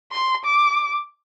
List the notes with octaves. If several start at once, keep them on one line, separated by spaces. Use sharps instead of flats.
C6
D6